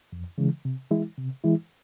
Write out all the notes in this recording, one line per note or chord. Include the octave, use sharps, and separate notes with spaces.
F2
C#3 E3 G#3
C3
E3 G#3 E4
C3
E3 G#3 E4